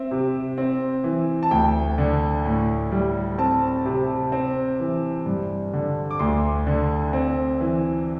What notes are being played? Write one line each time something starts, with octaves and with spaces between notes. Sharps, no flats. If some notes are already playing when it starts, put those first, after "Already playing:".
Already playing: C4 E5
C3
C4
E3
A5
D2 G5
D3
A2
G3
C4 A5
C3
C4
E3
G2
D3
D6
D2 C6
D3
C4
E3